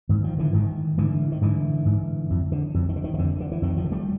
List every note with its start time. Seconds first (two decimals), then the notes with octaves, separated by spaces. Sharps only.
0.09 G#2 D#3
0.24 D#3 F3
0.39 D3 E3
0.53 G#2 D#3
0.98 G#2 D3 E3
1.32 D#3
1.42 G#2 D3 E3
1.86 G#2
2.30 F2
2.52 D3
2.74 F2
2.89 D#3
2.96 D3
3.04 D#3
3.14 D#3
3.18 F2 D3
3.40 D3
3.52 E3
3.62 F2 D#3
3.77 D#3 F3
3.84 D3
3.92 G3 A3